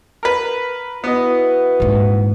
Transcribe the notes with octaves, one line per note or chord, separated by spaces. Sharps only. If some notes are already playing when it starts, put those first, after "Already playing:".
A#4 B4
B3 E4 F#4 B4 D#5
D#1 G#2